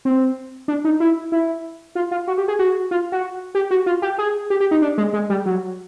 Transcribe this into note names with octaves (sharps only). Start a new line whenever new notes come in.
C4
D4
D#4
E4
E4
F4
F4
F#4
G4
G#4
F#4
F4
F#4
G4
F#4
F4
G4
G#4
G4
G4
D#4
D4
G#3
G#3
G3
F#3